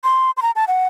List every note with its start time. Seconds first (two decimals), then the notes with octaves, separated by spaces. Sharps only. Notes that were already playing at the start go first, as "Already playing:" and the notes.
0.04 C6
0.37 C6
0.42 A#5
0.56 A5
0.68 F#5